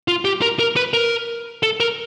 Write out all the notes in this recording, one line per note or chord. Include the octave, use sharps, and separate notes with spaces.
F4
G4
A#4
A#4
B4
A#4
A4
A#4